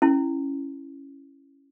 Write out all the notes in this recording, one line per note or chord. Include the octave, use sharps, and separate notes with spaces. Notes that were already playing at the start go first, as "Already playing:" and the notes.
C#4 E4